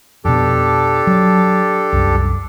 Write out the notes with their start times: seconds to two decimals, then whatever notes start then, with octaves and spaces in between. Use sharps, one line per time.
0.25 F2 B2 D4 G4 A4
1.07 F#3
1.92 C2 F#2